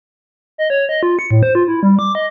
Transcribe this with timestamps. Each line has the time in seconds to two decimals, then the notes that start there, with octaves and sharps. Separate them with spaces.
0.58 D#5
0.70 C#5
0.89 D#5
1.03 F4
1.19 C#7
1.31 A2
1.43 C5
1.55 F4
1.68 E4
1.83 G3
1.99 D6
2.15 D#5